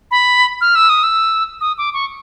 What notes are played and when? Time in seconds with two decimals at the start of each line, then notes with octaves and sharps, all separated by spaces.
0.11 B5
0.61 F6
0.75 E6
0.89 D#6
1.03 E6
1.61 D#6
1.78 D6
1.94 C#6